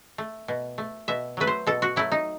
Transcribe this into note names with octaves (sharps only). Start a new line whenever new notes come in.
A3
B2
A3
B2 E5
F#3 A3 B4
C5
B2 A4
F#4
F#3 A3 E4
D#4